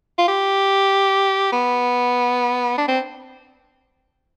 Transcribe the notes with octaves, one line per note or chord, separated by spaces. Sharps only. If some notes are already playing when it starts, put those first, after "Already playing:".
F4
G4
B3
D4
C4